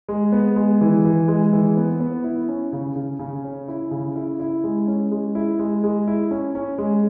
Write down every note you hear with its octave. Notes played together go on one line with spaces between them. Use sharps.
G#3
B3
G#3
E3
E3
G#3
E3
B3
B3
E4
C#4
C#3
C#3
C#3
C#4
E4
C#3
E4
E4
G#3
C#4
G#3
E4
G#3
G#3
E4
C#4
C#4
G#3